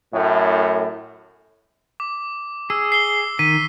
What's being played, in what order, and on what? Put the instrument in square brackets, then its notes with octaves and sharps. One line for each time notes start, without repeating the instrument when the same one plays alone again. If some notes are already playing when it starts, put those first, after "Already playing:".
[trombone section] F#2 A2
[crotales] D6
[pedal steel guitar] G#4 [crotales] E6
[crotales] C7 G7
[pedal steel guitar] D#3 [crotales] B6 D#7